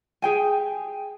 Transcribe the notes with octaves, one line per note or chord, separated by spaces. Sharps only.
G4 G#4 G5 G#5